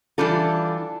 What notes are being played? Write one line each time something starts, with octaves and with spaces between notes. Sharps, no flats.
E3 G3 D4 F4 A4